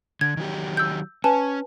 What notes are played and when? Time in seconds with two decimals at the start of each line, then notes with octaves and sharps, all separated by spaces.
0.21 D3 G#6
0.37 D#3 F#3 G4
0.77 E6 G6
1.24 C#4 B4 G#5 A5